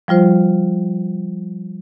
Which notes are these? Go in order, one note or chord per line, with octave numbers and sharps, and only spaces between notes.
F3 G3 F4 C5